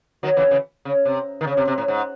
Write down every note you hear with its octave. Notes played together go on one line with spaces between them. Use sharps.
D#3 F#3
C#3 E3
C#3 E3
C#3
C3
D#3
C#3
C3
C3
A2
G#2